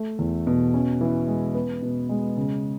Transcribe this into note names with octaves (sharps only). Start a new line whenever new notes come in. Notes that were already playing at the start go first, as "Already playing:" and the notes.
Already playing: A3
E2
B2
C#4
E3
G#3
B3
B2
G#3
C#3